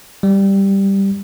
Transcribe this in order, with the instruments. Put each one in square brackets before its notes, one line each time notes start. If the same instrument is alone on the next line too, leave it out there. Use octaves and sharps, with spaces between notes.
[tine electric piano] G3